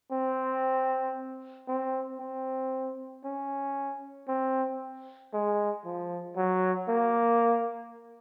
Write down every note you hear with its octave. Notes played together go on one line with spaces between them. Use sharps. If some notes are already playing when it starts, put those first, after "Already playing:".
C4
C4
C4
C#4
C4
G#3
F3
F#3
A#3